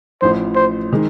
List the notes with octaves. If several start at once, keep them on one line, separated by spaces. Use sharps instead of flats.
A1 A2 F3 C5
C5
D#3 G#3